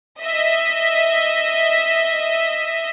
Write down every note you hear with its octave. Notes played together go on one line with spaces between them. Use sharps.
D#5 E5